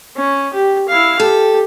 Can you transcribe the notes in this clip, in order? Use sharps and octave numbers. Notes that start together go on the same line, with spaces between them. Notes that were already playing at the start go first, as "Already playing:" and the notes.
C#4
G4
E4 F5
G4 A4